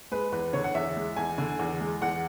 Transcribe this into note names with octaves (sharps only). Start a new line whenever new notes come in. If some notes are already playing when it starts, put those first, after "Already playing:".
G#3 B4
E2 B4
D3 C#5
F#5
E2 E5
G#3
E2 G#5
D3
E2
G#3
E2 F#5